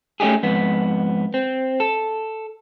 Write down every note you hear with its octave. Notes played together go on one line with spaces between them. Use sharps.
A3 C#4 D#4 G4 G#4
F2 G#2 B3
C4
A4